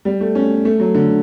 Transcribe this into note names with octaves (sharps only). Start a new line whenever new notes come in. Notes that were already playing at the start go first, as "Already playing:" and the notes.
G3
A3
C#4
A3
F#3
D3